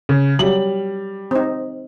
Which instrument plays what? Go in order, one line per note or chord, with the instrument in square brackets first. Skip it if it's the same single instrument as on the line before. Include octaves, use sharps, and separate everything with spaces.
[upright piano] C#3
[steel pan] F#3 [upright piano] G3 F#7
[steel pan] C4 D#4